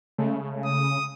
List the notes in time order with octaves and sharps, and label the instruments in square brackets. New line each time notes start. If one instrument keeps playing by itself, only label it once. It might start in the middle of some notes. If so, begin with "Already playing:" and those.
[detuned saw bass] C#3 [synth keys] G#3 A3
[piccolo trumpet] D#6